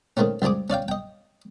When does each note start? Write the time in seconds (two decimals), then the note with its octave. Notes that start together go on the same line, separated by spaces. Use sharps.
0.17 D#3 G#3 A3 C4 C#4
0.42 C#2 G3 C4 G#4 D6
0.70 C#4 D5 F5 G5
0.88 D#5 G5